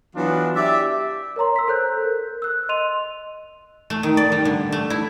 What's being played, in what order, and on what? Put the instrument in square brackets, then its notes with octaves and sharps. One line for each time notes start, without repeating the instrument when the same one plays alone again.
[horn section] E3 F#3 B3 D4 F4
G4 D5 E5
[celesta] A#4 C#5 A#5 C6
E6 B6
A4 C5 F#6 G6
A#4
E6 F#6
D#5 C6 D#7 F7
[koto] A3
D#3
D5
G3
D3
A3
E4